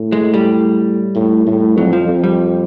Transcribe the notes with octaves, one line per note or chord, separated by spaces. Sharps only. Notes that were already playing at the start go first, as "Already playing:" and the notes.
Already playing: A2
G#3
G3
A2
A2
F2 F#3
F3
F2
G3